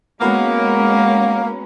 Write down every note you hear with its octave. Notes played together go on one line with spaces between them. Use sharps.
G#3 A#3 B3 C#4 F#4 A#4